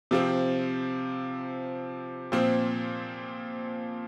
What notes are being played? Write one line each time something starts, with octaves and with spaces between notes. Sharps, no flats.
C3 F3 C4
A#2 F3 C4